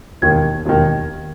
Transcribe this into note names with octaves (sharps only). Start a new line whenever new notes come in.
E1 D#2 D#3 G#6
E1 D#2 D#3